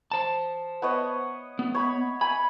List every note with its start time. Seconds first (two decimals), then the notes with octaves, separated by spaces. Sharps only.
0.12 C5 A5
0.82 B3 C#5 D#5
1.59 B3
1.75 C#5 B5
2.21 G#5 B5